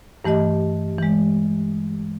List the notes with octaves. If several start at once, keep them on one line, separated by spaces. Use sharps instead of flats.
G2 E3 A3 G4 D#5
E3 G#3